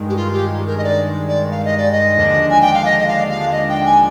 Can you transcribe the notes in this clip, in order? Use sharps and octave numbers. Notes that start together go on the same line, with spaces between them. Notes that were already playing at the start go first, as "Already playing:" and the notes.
Already playing: G2 D#3 G#3
G4
F4
G4
A#4
D#5
D5
D5
F5
D#5
D5
D#5
D#2 D3 F3 G#3 D4
G#5
G5
F5
D#5
D#5
F5
F5
D#5
G5
G#5